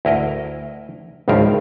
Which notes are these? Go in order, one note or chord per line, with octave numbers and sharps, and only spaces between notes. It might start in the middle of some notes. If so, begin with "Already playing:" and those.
D2 E4 A#4 D#5
G#1 C#2 G2 F3 F4 A#4